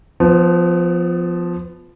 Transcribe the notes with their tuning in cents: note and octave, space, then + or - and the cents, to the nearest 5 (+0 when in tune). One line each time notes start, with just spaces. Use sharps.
F3 +0 B3 +30